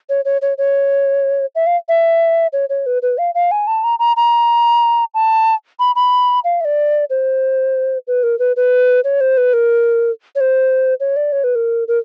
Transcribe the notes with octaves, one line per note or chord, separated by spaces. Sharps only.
C#5
C#5
C#5
C#5
E5
F5
E5
C#5
C#5
B4
B4
F5
F5
G#5
A5
A#5
A#5
A#5
A5
B5
B5
F5
E5
D5
C5
B4
A#4
B4
B4
C#5
C5
B4
A#4
C#5
C5
C#5
D5
C#5
B4
A#4
A#4